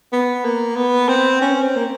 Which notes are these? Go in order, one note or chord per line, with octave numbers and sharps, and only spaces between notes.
B3
A#3
B3
C4
C#4
C4
A#3